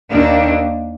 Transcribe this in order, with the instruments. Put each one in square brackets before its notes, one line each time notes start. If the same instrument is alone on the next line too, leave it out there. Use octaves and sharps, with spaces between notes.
[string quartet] D#2 D#3 A#3 D4